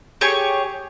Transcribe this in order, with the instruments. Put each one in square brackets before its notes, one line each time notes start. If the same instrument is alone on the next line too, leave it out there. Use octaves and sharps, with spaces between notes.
[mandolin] G4 G#4 C#5 C#6